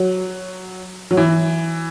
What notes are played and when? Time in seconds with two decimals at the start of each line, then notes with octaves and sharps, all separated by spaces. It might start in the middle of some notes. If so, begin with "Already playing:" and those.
Already playing: F#3
1.11 F#3
1.17 E3